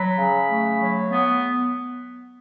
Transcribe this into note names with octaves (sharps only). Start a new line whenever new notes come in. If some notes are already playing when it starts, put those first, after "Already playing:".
Already playing: F#3 B5
C#3
A3
F#3
B3